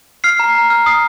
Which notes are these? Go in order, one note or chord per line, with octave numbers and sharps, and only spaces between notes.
F6 C7
A#5 C7
A#5
F6
D#6 C7